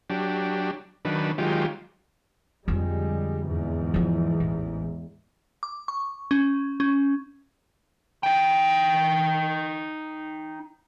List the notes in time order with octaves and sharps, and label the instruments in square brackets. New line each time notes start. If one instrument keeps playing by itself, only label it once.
[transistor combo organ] F#3 D4 G4
D#3 F#3 D4 B4
D#3 F#3 G#3 F4 G4
[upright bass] F2 D3 [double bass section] G3 G#3
[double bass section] E2 G#2
[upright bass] F3 E4
A1
[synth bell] D6
C#6
C#4
C#4
[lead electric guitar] D#4 G5